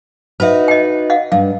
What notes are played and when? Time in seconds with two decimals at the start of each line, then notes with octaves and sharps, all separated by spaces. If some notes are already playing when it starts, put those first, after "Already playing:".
0.40 D#4 F#4 B4 C5 E5
0.68 D#5 G5
1.10 D#5 F5 F#5
1.32 G2 F5